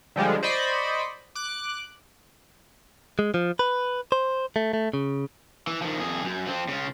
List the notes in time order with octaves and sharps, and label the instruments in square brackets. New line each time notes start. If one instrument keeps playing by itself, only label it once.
[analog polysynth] D3 F3 G3 G#3
C5 D5 D#5 B5 C#6
D6 F#6
[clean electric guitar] G#3
F3
B4
C5
A3
A3
C#3
[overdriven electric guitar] E3
D#3 F3
F2 G#4
F#2
F3 C4
C#3 F4